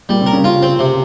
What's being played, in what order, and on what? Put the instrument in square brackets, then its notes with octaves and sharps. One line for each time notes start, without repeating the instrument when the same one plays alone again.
[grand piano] A#2 A#3 [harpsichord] G3
[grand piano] C3 C4
[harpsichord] A#4
[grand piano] C#3 C#4
[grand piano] C#3 C#4 [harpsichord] F4
[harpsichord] C4
C3